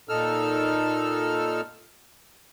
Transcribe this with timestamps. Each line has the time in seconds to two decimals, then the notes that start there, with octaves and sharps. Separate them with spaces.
0.09 A#2 D#4 A4 E6 F6